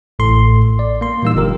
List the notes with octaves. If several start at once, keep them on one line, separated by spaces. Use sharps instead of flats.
A1 A2 A4 C6
D5
A#3 C6
A#2 E3 G3 A#3 D#4 E6
G1 D3 F4 G4 A#4